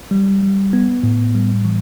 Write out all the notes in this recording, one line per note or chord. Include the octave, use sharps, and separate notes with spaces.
G3
G3
B3
A2
G3
E3